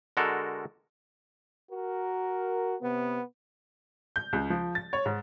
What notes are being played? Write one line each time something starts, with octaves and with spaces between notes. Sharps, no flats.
D3 G#3 F#4 A4 A#4
F#4 A#4
C3 B3
G6
C#2
F3
A6
C#5
G#2